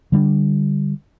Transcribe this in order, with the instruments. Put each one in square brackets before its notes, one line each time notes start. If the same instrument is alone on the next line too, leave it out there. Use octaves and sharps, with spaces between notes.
[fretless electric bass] D3 G3 C#4 D4